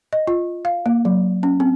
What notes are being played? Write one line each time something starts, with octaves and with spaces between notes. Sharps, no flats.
D#5
F4
F5
A#3
F#3
C#4
C4